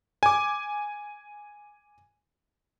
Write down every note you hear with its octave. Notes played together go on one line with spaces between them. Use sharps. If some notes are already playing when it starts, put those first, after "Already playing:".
G#5 D6